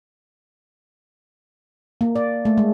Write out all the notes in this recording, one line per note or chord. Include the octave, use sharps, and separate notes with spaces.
A#3
D5
A3
G#3